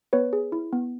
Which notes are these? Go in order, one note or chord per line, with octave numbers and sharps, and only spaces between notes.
B3 B4 C#5
G#4
E4
B3